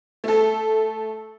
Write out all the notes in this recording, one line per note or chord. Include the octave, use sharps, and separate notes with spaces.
A3 A4